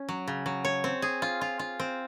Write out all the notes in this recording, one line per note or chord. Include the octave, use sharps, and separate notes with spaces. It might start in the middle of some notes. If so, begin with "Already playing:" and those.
Already playing: C#4
F#3
C#3
F#3
C#5
C4
G#4
F4
F4
F4
C4